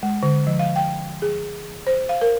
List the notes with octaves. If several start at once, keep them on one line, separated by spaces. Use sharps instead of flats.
G#3
D3
F3
F5
G5
G#4
C5
F5
A#4